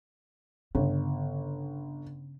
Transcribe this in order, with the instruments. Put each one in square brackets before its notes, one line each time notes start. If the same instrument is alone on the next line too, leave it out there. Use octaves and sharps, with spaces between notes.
[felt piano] G1 [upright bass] C#3